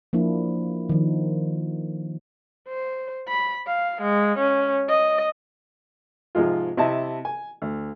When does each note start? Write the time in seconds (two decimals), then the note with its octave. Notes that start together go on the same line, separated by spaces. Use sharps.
0.13 F3 A#3 D4 E4
0.89 D#3 F3
2.68 C5
3.28 B5
3.66 F5
4.01 G#3
4.38 C#4
4.88 D#5
6.35 G#2 C3 F3 G#3 F4
6.77 C3 E4 D#5 A5
7.25 G#5
7.62 D2